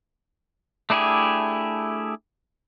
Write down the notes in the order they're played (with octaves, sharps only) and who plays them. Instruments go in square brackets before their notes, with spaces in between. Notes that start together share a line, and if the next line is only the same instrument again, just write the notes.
[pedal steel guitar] A3 D4 E4 G4 G#4